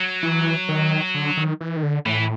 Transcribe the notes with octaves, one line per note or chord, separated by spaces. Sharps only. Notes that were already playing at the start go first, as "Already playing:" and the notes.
Already playing: F#3
E3
D#3
D3
D#3
E3
D#3
D3
A2 E3